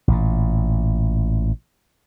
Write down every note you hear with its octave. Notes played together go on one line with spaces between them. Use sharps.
A1 A#2